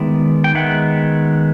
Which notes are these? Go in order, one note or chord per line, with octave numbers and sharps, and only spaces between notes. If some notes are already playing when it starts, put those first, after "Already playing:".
Already playing: D#3 G#3 B3 D5 E5
G5
D#3 G#3 B3 E5 F#5